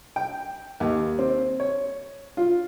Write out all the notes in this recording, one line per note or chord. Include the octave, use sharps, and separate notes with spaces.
G5
D#2
C4
C#5
F4